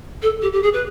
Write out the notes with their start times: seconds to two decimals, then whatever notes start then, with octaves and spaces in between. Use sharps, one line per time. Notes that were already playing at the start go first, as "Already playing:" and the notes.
0.22 A4
0.42 G4
0.53 G4
0.63 G#4
0.73 B4